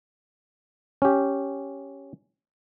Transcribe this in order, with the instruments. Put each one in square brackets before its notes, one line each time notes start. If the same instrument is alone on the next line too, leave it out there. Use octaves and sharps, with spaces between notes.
[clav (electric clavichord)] C#4 G4